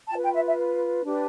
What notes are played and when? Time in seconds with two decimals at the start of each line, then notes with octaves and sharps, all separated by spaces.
0.09 A5
0.12 F4 B4 G5
0.24 G5
0.35 E5
0.47 E5
1.04 D4 G4 B4